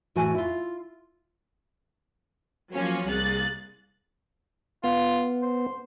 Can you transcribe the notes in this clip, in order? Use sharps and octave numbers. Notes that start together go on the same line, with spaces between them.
A2 E3 F#4 B4 G#5
E4 F4
F3 F#3 A#3 C#4 F4
C2 A#3 G#4 F#6 A6
B3 F4
C5